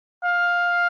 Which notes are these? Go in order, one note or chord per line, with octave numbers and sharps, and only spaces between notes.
F5